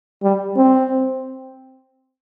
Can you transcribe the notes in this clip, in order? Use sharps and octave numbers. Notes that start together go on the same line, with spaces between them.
G3
C4